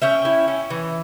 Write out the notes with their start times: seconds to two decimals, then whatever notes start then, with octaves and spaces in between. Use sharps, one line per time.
0.02 C#4 E5 G5
0.25 E4
0.48 C#4
0.70 E3